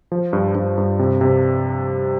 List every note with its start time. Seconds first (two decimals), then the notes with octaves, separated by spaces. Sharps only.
0.12 F3
0.33 G2
0.55 G2
0.78 G2
0.99 C3
1.21 C3